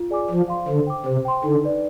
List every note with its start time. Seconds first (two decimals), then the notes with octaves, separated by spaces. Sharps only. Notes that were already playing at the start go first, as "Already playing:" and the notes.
Already playing: F4
0.10 G#4 D5 G#5 D6
0.29 F3 C5
0.48 F5 C6
0.67 D3 C5
0.87 G5 D6
1.06 C3 C5
1.25 G5 C6
1.43 D3 D#4
1.64 B4 D5